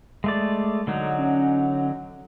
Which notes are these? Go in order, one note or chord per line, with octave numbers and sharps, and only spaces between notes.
G#3 A3 D5
D3 F#3 D#4
C#4